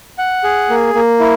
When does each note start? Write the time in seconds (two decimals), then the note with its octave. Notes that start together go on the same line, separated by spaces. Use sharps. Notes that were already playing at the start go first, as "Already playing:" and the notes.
0.18 F#5
0.44 G#4
0.70 A#3
0.94 A#3
1.20 E4